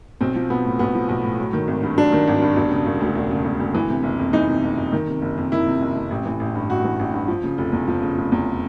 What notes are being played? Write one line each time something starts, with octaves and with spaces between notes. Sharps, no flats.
B1 C4
F3
B1 B3
A2
B1 B3
F3
B1
A2
F#3
D#3
G#1
G2
F#3 D4
D#3
G#1
G2
E1
C#3
E1
D2
E1
C#3
E1
D2
E3
C3
F#1
F2
E3 D#4
C3
F#1
F2
D#3
C3
F#1
F2
D#3 E4
C3
F#1
F2
A1
E3
A1
G2
A1 F#4
E3
A1
G2
F3
C#3
F1
E2
F3
C#3
F1
E2